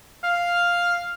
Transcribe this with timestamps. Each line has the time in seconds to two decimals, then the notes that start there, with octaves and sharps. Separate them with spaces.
0.24 F5